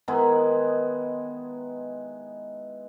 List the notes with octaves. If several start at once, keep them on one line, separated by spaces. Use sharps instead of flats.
D#3 G#3 B3 E4